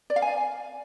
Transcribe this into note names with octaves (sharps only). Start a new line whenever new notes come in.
D5
F5
G#5